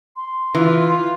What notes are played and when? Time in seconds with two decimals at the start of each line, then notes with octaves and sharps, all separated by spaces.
0.16 C6
0.55 E3 F4